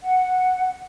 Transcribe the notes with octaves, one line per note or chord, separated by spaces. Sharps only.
F#5